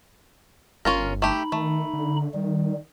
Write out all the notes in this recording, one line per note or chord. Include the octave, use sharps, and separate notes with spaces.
G1 C#4 F4 A#4
A3 D#4 G4 B5
D#3 A3
D3
D#3 G3